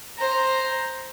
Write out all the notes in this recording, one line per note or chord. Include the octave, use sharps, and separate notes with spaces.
C5 A#5